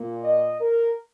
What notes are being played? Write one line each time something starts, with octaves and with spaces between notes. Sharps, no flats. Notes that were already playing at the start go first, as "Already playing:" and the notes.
Already playing: A#2 A#3
D#5
A#4